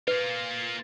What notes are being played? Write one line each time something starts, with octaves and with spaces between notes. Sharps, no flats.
A#3 F4 B4